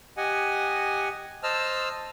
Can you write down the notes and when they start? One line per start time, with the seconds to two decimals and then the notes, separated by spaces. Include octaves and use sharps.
0.17 G4 D#5 F#5 G#5
1.43 C5 D#5 A5 E6 F6